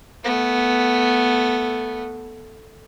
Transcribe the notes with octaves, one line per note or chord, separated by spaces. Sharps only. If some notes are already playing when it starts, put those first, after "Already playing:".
A3 B3